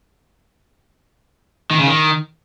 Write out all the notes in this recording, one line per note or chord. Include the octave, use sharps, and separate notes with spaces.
D#3
C#3
D#3